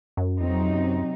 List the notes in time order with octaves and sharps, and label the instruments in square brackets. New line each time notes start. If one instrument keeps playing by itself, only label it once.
[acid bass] F#2
[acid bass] F2 [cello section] C3 F#3 C4 D#4
[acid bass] F#2